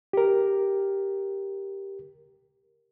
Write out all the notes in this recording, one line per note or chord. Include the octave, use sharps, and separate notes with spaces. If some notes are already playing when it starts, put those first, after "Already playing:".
G4 A#4